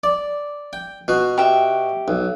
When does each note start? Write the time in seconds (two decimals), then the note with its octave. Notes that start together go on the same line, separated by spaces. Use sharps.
0.04 D5
0.73 G5
1.08 B2 F#4
1.38 G4 E5
2.08 B1